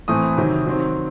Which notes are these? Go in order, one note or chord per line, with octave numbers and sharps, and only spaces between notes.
A2 E3 A3 C4 D#6
C3 D#3 F#3
D#3 F#3 C4